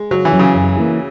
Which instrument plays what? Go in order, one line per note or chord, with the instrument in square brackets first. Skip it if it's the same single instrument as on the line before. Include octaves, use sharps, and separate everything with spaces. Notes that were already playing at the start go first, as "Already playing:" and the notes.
Already playing: [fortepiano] G#3
[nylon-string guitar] C#3 [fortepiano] F#3
[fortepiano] E3
[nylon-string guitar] F#3 C#4
[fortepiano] C#3
[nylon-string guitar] F#2
E3 A#3 E4 G#4